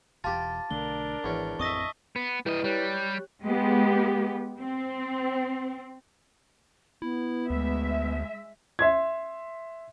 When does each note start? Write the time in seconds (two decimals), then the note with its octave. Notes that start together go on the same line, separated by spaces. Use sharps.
0.24 E1 E2 F4 G4 G5 A5 A6
0.71 B1 D3 A3 D4 A#4 G7
1.24 G#1 E2 C#4
1.59 A1 F2 C4 D#5 E5 C#6 D#6 A#6
2.16 B3
2.46 G3 E4 B4 D#5
2.64 G3 G4 C#5 F#6
3.45 G#3 B3 G4
4.58 C4
7.02 B3 E4
7.50 D2 G#3 E5
8.79 E5 C6 G#6